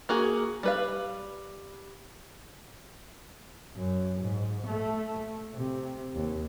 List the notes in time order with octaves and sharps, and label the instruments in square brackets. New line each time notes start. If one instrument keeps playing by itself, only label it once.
[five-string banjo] A#3 F#4 G#4
G3 B4 F5
[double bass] F#2
G#2
A3
C3
D#2